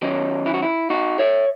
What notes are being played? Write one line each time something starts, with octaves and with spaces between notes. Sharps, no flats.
D#3 F#3 C#4 D#4
E4
F#4
E4
D#4 F#4
C#5 E5